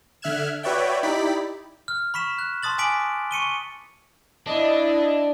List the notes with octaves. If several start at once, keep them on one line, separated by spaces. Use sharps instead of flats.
D3 E5 F6 F#6 G#6 E7
F#4 B4 C#5 D5 E5 G5
D#4 E4 G4 D5 B5 B6
F6
B5 C#6 B6 E7
F#6
A5 C6 D#6 A6 F#7
G#5 D6 B6 D7 F#7
C#6 C#7 D#7 G7
D4 E4 D#5